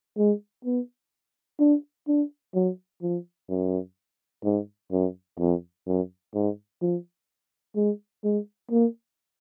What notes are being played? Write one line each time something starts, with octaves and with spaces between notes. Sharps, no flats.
G#3
B3
D4
D4
F#3
F3
F#2
G#2
F#2
F2
F#2
G#2
F3
G#3
G#3
A#3